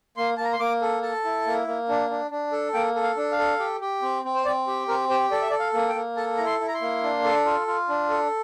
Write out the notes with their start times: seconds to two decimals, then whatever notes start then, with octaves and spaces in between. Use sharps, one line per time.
0.17 A#3 C6
0.37 A#3 A5
0.45 A#5
0.53 C6
0.59 A#3 D6
0.82 A4
1.02 A4 A5
1.25 E4
1.46 A#3
1.67 A#3
1.89 D4
2.10 D4
2.31 D4
2.52 A4
2.74 A#3 G5
2.95 A4
3.03 F5
3.17 D4
3.32 F5
3.39 A4
3.59 G4
3.81 G4
4.02 C4
4.25 C4
4.35 C5
4.45 C4 D5
4.67 G4
4.88 C4 A#4
5.09 G4 C5
5.31 A4 D5
5.41 E5
5.50 A4 D5
5.59 F5
5.74 A#3
5.89 G5
5.95 A#3
6.17 A4 A5
6.37 E4 A#5
6.46 C6
6.60 E4
6.68 A#5
6.74 C6
6.81 A#3
7.03 D4
7.24 A4
7.45 F4
7.67 F4
7.89 D4
8.10 A4